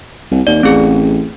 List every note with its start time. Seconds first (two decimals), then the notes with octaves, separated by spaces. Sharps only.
0.31 C2
0.47 D#2 D5
0.63 A1 C4 G#4